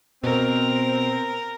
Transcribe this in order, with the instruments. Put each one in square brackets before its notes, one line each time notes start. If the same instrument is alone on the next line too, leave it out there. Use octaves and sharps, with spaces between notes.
[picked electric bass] B2 [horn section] C4 [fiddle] A#4